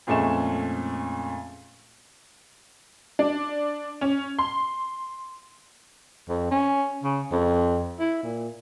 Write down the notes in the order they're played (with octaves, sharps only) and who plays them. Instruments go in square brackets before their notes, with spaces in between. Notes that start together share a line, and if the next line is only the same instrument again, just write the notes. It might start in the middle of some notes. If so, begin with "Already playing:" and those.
[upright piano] F2 A#2 G#3 A3 C#4 E7
[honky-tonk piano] D4
C#4
C6
[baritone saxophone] F2
C#4
C#3
F2
E4
A#2